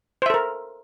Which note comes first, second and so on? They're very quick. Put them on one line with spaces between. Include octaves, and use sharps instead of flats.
C5 E5 A4 A#4